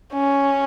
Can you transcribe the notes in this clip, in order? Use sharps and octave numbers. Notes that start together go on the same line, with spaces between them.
C#4